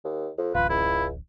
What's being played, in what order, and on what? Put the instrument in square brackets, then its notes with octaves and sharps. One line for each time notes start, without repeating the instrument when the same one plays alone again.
[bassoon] D#2
F2
[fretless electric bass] D1 A1 [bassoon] F4 [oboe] B4
[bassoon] C#2 [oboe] E4